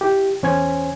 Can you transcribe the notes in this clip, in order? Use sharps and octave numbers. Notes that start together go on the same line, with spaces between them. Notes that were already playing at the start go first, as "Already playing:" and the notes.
E4 G4
E2 C#4 C5 C#5 G#5 G#6